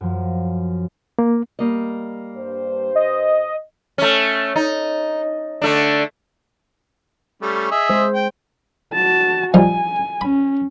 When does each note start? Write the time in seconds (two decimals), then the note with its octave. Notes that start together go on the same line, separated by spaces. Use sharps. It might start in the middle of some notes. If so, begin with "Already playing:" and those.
0.01 F#2 F3
1.19 A#3
1.59 G3 A#3 D#5
2.36 G2 C5
2.95 D#5
3.98 A3 C#4
4.56 D#4
5.62 D3 A3 D4
7.42 G3 A3 C#4
7.71 G#4 D#5 E5
7.90 G#3 C5
8.15 G5
8.93 F#4 A5
9.54 F3 G3 D#4 G#5
10.21 C#4 B5